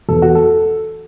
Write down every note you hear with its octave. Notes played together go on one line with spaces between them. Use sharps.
E2 A4
F#4
A4